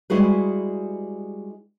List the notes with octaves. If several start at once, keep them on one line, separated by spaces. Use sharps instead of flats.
G3 G#3 E4 F#4 G#4 B4